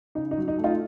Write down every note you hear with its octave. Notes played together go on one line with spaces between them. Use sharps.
C#3 D#4
D#4
F#3
D#4
A3
D#4 F4